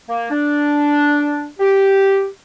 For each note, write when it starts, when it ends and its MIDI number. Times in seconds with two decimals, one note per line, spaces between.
0.09 0.27 58
0.31 1.47 62
1.59 2.27 67